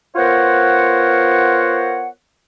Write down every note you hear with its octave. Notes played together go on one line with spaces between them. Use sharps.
B3 F4 A#4 C5 C#5 F#5